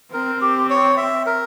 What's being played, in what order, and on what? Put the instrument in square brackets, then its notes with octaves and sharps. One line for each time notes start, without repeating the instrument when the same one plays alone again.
[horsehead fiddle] C4 [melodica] A#4
[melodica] G4
C#5
E5
A#4